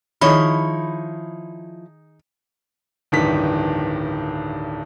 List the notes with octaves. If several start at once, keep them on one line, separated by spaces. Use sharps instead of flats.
D#3 F3 D#4 E4 G#4 C#5 B5
D1 G2 D#3 E3 B6